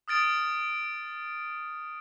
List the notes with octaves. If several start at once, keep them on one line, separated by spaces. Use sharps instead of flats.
D#6 F6 A6 D7